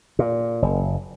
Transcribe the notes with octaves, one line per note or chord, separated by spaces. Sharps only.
A#2
F#1